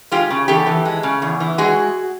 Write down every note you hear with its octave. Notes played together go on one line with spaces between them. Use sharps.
G#3 F4 G4
C#3
E2 G4 A4
E3
G#3
C#3
E2
E3
G#3 F#4 G#4